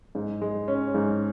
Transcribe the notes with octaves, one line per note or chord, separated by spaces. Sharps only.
G#2
G#3
C#4
G#2